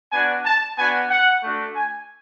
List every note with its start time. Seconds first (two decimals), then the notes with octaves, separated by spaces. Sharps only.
0.12 B3 D4 F#4 G#5
0.44 A5
0.77 B3 D4 F#4 G#5
1.10 F#5
1.42 A3 D4 F#4
1.75 G#5